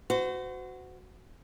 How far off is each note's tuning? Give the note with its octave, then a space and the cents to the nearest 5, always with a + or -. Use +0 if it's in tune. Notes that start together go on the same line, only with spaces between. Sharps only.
F#4 +0 C5 -40